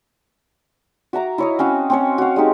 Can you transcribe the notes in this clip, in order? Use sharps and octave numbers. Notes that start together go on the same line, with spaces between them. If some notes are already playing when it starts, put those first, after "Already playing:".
F#4 E5 A#5 D6
E4 C#5 D#5
C4 C#4 F#4 F5
C4 C#4 C#5
F#4 F5
G#3 D#4 G4